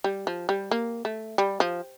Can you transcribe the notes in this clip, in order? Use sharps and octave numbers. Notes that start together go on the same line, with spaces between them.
G3
F3
G3
A#3
A3
G3
F3